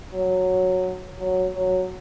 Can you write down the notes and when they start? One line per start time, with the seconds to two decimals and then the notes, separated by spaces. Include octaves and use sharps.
0.13 F#3
1.19 F#3
1.54 F#3